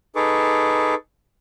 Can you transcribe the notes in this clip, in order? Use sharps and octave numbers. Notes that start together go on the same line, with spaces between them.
D#4 G#4 A4 B4 C#6 D6